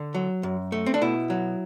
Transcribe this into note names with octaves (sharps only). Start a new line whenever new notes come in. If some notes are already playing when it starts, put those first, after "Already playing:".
Already playing: D3
F#3
F#2
A3
C4
D4
B2 E4
F#3